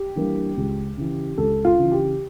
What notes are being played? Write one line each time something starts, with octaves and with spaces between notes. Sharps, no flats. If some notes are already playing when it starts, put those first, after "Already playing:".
Already playing: G4
E3 G3 A#3 D4
C#2
C#3 E3
C#2 A4
F4
C#3 E3
G4